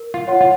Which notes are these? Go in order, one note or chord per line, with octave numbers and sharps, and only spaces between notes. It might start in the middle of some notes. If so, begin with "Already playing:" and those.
Already playing: A#4
F4
C#5 F#5 C6
F4